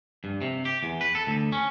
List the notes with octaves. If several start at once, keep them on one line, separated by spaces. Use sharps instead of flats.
G2
C3
G4
E2
B4
A4
D2
C#4